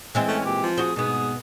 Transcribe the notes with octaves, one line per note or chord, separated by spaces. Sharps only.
E3 G#3 C4
A3 C#4
A#2 G4
F3
F#4 G#4 C5
G#2 B2 B3 G#4